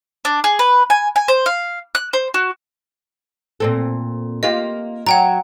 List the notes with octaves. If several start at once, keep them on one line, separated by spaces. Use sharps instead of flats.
D4
G#4
B4
G#5
G#5
C5
F5
F#6
C5
F#4
A#2 C4 A4
A#3 F4 G4 D#5
F#3 F#5 G5 A#5